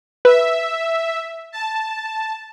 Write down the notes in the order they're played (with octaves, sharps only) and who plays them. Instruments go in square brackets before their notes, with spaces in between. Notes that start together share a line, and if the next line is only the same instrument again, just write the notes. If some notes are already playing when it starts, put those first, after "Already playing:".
[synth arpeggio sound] B4 [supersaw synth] E5
[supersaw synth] A5